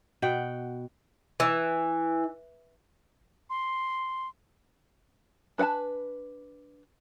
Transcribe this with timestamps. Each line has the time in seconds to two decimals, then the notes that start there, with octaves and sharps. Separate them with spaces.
0.22 B2 F#5 G5
1.40 E3
3.50 C6
5.58 D4 B4 F#5 G#5 A5